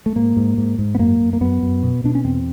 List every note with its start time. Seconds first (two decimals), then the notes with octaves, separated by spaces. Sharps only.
0.06 A3
0.16 G#2 A#3
0.37 G#2
0.57 G#2
0.78 G#2
0.95 B3
0.99 F#2 A#3
1.20 F#2
1.33 A#3
1.41 F#2 B3
1.62 F#2
1.83 B2
2.04 B2 D4
2.15 C#4
2.24 E2 C4